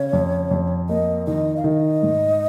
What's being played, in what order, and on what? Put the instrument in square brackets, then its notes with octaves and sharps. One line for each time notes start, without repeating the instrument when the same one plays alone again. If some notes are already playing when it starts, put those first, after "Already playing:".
Already playing: [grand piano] C#3 [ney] C#5
[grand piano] F2
F2
[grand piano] A#3 [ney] D#5
[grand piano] D#3 [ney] D#5
[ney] F5
[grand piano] D#3 [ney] D#5
[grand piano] G#2